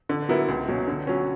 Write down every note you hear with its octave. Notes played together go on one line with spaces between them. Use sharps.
D3
F#3 B3 E4 A#4
C#2
B2 F#3 C#4
D3
F#3 C#4